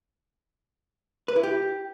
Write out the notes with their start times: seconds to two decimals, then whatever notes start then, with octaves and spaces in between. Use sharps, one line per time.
1.28 B4
1.36 E4
1.43 G4